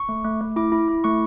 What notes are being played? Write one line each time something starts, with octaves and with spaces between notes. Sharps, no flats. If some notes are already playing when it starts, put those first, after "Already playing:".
Already playing: C#6
A3
A3
A3
E4 D6
E4
E4
A3 C#6